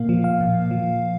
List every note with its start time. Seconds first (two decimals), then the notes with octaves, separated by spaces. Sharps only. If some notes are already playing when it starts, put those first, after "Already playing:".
Already playing: A#2 A#3 F5
0.09 F3
0.24 F5
0.41 A#2
0.71 F3